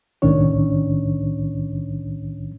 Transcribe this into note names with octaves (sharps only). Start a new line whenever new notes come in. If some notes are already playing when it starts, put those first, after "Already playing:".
C2 A2 D#3 C#4 D4 C#5